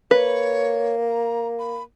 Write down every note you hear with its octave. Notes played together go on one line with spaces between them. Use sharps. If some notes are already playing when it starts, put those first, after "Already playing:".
A#3 B4 C#5
A#5
B5